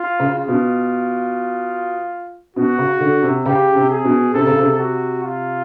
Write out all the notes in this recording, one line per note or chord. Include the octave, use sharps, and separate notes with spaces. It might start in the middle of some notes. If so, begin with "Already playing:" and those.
Already playing: F4
C#3
F4
B2
B2 F#4
C#3
D3
C3
C#3 G4
C3
G#4
B2
C3 A4
C#3
C3
F#4
F4